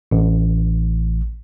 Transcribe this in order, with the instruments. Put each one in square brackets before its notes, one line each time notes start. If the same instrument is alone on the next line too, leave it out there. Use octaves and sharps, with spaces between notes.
[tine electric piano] A1